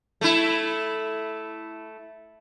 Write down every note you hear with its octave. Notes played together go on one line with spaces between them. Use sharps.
A3 E4